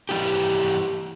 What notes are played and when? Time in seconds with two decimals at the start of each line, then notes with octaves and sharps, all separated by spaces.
0.09 E3 G3 B3 E4 G4